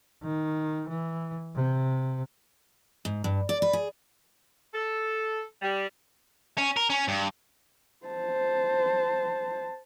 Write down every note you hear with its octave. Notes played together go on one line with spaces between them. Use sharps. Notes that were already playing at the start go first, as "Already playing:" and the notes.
D#3
E3
C3
G#2
G2
D5
B4
G#4
A4
G3
C#4
A#4
C#4
G2
C5 A5